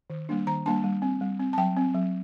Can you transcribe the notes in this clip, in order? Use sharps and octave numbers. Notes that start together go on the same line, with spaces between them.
D#3
G3 A#3 D4
D#3 A#5
G3 A#3 D4 A5
G3
C4
G3
C4
A5
F#3 G5
C4
F#3